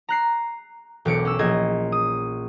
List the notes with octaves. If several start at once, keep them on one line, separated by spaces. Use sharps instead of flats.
A#5 F#6 C7
E1 B1 D6 C#7
C#4 E6
A#1 D#5 G#6
D#6